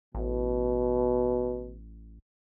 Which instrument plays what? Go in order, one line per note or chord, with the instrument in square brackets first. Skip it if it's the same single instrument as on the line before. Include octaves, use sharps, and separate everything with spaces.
[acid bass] A1 [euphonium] B2